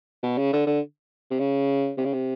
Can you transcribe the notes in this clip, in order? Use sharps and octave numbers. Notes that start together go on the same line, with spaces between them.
B2
C#3
D3
D3
C3
C#3
C3
C#3
C3